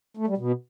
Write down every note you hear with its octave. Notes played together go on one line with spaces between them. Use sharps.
A3
G3
B2